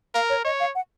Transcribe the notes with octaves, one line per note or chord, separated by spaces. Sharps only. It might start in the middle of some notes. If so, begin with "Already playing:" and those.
A#4 F5
C#5
C#5 D#5
F5
F#5